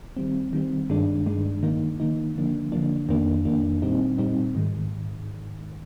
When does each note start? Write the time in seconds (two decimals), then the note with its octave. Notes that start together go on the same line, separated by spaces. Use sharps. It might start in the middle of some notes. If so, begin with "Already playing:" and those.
0.17 D#3 G3 C4
0.53 D#3 G3 C4
0.90 G2 D#3 G#3 D4
1.26 G2 D#3 G#3 D4
1.63 D#3 A#3 D#4
2.00 D#3 A#3 D#4
2.35 D3 F3 A#3 D4
2.72 D3 F3 A#3 D4
3.09 F2 D#3 A#3 D4
3.45 F2 D#3 A#3 D4
3.82 A#2 G3 C4 D#4
4.18 A#2 G3 C4 D#4
4.55 G#2 D#3 G#3